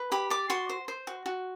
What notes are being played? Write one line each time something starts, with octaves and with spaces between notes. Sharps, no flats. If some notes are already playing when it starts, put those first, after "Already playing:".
Already playing: B4
G4 B5
D5 D6
F#4 C6
C5
C5
F#4
F#4